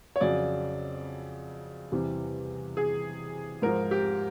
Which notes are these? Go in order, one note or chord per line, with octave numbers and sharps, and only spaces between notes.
C#5
F2 C#3 F#3 D5
E2 C3 E3 G3
G#4
G#2 F3 A#4
G4